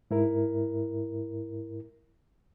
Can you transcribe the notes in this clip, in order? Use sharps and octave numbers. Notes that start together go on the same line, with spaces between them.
G#2 E4 A#4